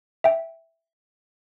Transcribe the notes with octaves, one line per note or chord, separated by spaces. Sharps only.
E5 G5